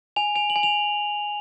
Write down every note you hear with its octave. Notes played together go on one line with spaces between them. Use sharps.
G#5 F7
G#5 F7
F#7
G#5
F7